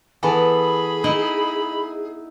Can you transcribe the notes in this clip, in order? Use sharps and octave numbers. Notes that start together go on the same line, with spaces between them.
E3 B3 G#4 A4 B5
D#4 E4 D#5